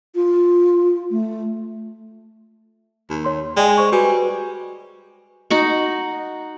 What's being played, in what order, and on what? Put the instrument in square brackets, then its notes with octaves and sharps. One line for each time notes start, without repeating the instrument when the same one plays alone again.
[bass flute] F4
A3
[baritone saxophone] D#2
[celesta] C#5 C6
[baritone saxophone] G#3 [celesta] D5 G5 G#5
[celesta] C5 C#6
[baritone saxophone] G3 [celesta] F#4 B4 G#5
[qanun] D#4 F#4 F#5